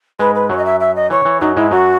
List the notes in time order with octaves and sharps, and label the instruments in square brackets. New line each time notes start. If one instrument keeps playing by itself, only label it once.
[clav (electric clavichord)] G#2 G#3 [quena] B4
[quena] B4
[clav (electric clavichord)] F#2 F#3 [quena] C#5
[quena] D#5
E5
E5
D#5
[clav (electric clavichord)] E3 [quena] C#5
[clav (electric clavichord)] E3
[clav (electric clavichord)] F#2 F#3 [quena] D#4
[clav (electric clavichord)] G#2 G#3 [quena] E4
[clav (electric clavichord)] F#2 F#3 [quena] F#4